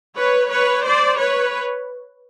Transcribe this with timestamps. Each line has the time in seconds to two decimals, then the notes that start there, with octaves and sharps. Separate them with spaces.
0.16 B4 C#5
0.50 B4 C#5
0.85 C5 D5
1.19 B4 C#5